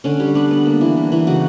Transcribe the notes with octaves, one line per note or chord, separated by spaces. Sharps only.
D3 C#4
G3
B3 D4
B3
A#3
E3
A#3
E3
C#3 F#4